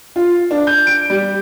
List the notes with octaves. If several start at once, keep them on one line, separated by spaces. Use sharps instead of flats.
F4
D4
G6
D7
G3